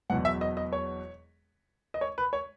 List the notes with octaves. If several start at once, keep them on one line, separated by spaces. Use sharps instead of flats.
E1 E2 B2 F#3 F#5
E5
D#5
D#5
C#5
D#5
C#5
B4
C#5